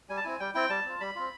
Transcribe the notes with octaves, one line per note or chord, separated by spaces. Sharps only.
G3 G#5
A5
C4 E4 G#5
G3 G5
C4 E4 G5
G3 A5
C4 F4
G3 B5
C4 F4